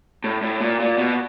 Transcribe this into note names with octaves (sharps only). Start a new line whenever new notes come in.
A2
A2
A#2
A#2
B2